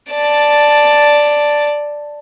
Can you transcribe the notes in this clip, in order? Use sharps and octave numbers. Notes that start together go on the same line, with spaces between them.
D5 A5